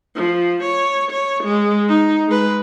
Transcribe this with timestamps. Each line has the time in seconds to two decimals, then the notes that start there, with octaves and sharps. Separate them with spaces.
0.16 F3
0.63 C#5
1.11 C#5
1.44 G#3
1.89 D#4
2.28 G#3 B4